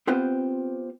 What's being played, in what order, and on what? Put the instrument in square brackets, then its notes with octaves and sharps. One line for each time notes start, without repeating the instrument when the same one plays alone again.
[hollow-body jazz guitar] B3 C4 F4 G4 B4 C5